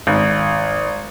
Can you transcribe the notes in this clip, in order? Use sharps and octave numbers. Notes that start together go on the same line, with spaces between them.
G#1